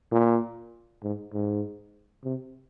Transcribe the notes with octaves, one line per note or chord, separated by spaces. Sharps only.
A#2
G#2
G#2
C3